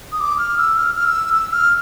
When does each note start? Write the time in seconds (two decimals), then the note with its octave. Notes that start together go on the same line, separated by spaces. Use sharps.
0.12 D#6
0.20 D6
0.38 F6
0.57 E6
0.77 F6
0.95 F6
1.05 E6
1.34 E6
1.53 F6